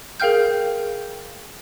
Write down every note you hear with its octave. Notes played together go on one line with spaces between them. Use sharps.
G#4 A#4 F5 G5 F6 G6